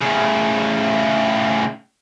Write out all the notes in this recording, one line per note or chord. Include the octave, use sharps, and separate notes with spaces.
A2 C#3